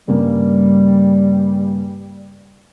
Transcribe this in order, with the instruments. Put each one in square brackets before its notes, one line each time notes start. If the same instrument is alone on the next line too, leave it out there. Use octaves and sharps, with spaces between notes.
[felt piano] G2 C#3 A#3 [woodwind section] G3